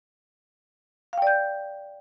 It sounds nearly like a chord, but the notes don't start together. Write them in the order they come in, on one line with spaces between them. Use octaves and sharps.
F5 G5 D5 G6